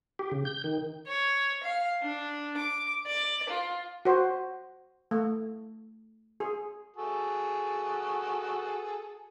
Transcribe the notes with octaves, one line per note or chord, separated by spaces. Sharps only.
G4
C#3
G6
D#3
C#5
F5
D4
D6
D5
F4
F#4 C5
A3
G#4
F#4 G#4 A4